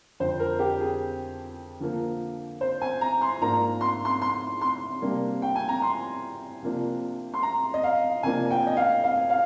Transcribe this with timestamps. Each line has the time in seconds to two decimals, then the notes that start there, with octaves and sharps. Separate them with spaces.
0.20 F2 D3 F3 C5
0.40 A#4
0.59 G4
0.80 G#4
1.80 D3 F3 A#3
2.61 C5
2.81 G#5
3.01 A#5
3.21 C6
3.41 G#2 F3 A#3 D4 A#5
3.81 C6
4.05 C6
4.22 C6
4.61 C6
5.02 C3 G3 A#3 D4
5.42 G5
5.56 G#5
5.69 A#5
5.82 C6
6.62 C3 F3 A#3 D4
7.34 C6
7.43 A#5
7.74 D#5
7.84 F5
8.23 C3 F3 A#3 D4 G#5
8.50 G5
8.67 D#5
8.77 F5
9.04 F5
9.30 F5